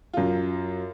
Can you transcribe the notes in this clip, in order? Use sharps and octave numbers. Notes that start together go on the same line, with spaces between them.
F#2 F4